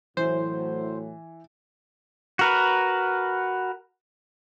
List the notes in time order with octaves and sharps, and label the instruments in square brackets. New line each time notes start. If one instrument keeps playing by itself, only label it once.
[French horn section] A2 F#3 [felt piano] E3 [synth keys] C5
[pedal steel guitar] F#4 A#4 B4